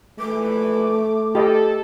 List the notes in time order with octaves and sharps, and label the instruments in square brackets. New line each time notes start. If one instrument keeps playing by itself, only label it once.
[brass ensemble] A#1 E3 B4 [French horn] A3 [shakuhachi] D6
[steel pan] G4 D#5 [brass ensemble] A4